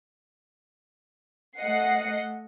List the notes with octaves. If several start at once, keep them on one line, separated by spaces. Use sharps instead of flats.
A3 D#5 F#5 C7